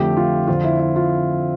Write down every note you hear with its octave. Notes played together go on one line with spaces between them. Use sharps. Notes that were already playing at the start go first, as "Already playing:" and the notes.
Already playing: F2 D3 A3 G4
F4
F2 D3 F3 C4 F4
E4
E4
F4